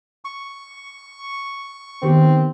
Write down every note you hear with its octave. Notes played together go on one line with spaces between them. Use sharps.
C#6
D#3 B3 C4 G4 A#4